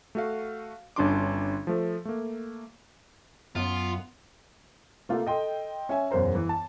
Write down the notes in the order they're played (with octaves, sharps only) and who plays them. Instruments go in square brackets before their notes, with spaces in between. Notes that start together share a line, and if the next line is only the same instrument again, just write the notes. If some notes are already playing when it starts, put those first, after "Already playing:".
[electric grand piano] A3 F#4 F5
G1 C#4 D4 F#4 C6 D6
F3 A3
A3 A#3
[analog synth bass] F#2 [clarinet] B3 [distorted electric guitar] F4
[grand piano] C3 A3 A#3 F4 G4
A4 D#5 G5 C6
C#4 E5 G#5
E1 F#2 A#4 C5 A#5
E3
A5